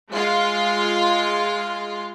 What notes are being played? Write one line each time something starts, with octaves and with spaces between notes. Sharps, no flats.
G#3 F4